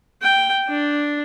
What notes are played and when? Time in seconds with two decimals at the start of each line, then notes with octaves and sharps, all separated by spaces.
0.22 G5
0.68 D4